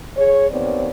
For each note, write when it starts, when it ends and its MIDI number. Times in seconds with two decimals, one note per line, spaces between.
0.16 0.48 68
0.16 0.48 73
0.50 0.88 39
0.50 0.88 59
0.50 0.88 60
0.50 0.88 73
0.50 0.88 74